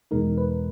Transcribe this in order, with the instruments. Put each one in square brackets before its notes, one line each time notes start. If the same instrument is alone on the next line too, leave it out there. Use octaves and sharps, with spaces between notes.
[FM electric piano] E2 B2 G#3 D#4 A#4
B4